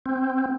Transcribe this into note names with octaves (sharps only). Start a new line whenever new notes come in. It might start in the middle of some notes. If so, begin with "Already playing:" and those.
C4